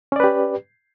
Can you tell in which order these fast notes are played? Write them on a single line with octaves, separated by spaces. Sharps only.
C#4 D5 B4 G4